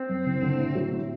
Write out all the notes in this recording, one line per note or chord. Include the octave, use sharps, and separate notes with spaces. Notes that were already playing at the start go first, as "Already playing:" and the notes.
Already playing: C4
F#2
F#1
D3
A2
F#3
A2